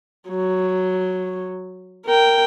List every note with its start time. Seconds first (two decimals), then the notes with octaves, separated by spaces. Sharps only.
0.30 F#3
2.06 A#4 G5